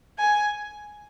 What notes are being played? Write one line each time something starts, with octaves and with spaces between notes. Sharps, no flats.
G#5